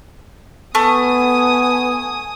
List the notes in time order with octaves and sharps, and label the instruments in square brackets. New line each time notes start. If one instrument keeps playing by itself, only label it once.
[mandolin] A3 [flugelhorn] B3 [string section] G#5 D#6